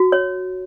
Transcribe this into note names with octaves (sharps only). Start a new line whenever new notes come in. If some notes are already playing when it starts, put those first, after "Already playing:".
Already playing: F#4
C#5